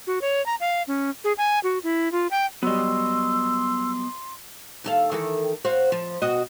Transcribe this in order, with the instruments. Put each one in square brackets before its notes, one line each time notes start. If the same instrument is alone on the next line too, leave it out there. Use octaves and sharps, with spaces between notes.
[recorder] F#4
C#5
A#5
F5
C#4
G#4
G#5
F#4
E4
F4
G5
[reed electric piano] F#3 G3 [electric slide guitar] B3 D#5 [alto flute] C6 [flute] E6
[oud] D#2 A4 F5
D#3 E3 A4
F#4 C5 F5
F3
B2 F#4 D#5